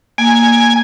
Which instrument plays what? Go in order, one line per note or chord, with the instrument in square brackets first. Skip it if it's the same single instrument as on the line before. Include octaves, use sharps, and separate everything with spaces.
[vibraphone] A#3 [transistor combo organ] G#5